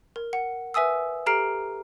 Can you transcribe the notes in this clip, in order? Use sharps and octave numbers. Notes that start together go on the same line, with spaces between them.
A#4
F#5
B4 E5 G#5 D#6 E6
G4 A4 A#5 F6 C7 D7